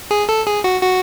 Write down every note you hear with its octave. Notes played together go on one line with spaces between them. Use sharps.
G#4
A4
G#4
F#4
F#4